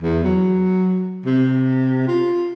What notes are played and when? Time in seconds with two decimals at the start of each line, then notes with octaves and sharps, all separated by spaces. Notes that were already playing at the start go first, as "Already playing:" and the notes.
0.02 E2
0.24 F#3
1.26 C3
2.07 F4